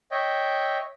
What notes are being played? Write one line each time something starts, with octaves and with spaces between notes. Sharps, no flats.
C#5 D#5 E5 G5